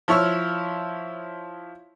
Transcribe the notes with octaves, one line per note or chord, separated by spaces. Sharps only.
F3 E4 C#5 E6 F6